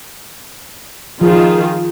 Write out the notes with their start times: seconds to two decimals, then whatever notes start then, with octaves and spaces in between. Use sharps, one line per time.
1.21 D#3 F3 F4 G#4